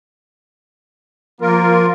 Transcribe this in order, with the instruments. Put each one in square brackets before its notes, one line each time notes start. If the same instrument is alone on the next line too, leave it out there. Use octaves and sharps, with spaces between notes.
[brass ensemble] F3 A#3 [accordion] F4 A#4